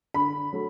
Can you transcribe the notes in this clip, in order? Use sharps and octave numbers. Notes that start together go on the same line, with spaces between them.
D3 B5
F#3 A3